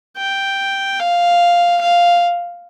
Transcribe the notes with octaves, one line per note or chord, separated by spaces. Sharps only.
G5
F5
F5